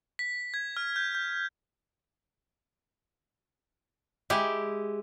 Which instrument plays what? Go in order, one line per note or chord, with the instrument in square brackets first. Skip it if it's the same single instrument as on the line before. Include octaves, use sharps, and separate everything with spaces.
[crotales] B6
G#6
F6
G6
G6
[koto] G#3 E4 G4